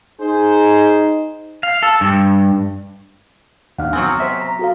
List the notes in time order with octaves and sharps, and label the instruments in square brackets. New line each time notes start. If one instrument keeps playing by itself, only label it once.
[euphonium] D#4 [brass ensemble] G#4 C5
[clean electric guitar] F5
A4
G2
[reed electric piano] D#2 D4 F5 [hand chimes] F#5 F6
[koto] F#3 B3 C4 [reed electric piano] G#5
[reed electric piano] C5 E5 [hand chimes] B6
[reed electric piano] A#5
[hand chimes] F#4 A4 F5